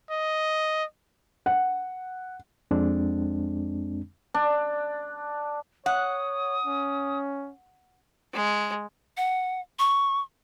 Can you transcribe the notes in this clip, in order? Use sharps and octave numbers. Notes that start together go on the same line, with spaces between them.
D#5
F#5
F2 G#3 C4 D4
D4
C#5 F#5 D#6
C#4
G#3
F#5
C#6